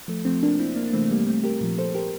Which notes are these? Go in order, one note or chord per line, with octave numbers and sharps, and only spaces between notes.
F3 A3
C3 F3 A3 C4
A#3 D4
C4 E4
A#3 D4
D4
C3 E3 A3 C4
A3
G3 A#3
A3 C4
G4 A#4
A#2 F3
A4 C5
G4 A#4